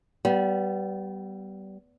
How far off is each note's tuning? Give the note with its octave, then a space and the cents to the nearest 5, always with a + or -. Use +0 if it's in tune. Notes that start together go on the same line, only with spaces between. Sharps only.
G3 -25 B3 +0